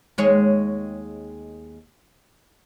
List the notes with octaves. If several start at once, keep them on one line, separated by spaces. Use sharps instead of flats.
D#2 G#3 C#5